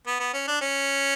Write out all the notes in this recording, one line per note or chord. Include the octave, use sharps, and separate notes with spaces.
B3
B3
C#4
D4
C#4